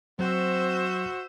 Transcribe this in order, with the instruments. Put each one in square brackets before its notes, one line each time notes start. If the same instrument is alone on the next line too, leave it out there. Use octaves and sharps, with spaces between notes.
[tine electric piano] F#3 [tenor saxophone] C4 [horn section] F#4 [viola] C5 E5